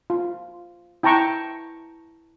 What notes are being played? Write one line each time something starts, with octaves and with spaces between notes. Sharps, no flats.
F4
E4 G5 A5 A#5 C#6